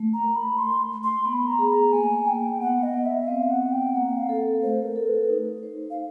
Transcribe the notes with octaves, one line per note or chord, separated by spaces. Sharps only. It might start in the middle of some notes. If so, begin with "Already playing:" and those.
Already playing: A3
A#5
A#4
B5
A3 C6
A3
C6
B3 B5
A#5
G#4
A#5
A#3 G#5
A#3 G5
B3 F#5
D#5
B3
E5
C4 F5
F#5
C4
G5
A#3 F#5
F5
A4
A3 C5
A#4
A4
B4
D#4
C5
F5